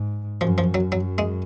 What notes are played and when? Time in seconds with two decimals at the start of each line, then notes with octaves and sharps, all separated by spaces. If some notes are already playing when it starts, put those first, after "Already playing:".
Already playing: G#2
0.41 F#2 F3
0.58 F3
0.74 F#3
0.92 F#2 F#3
1.18 G#3